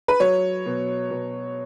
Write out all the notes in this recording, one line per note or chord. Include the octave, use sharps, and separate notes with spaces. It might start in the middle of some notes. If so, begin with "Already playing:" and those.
B4
F#3 C#5
B2
B2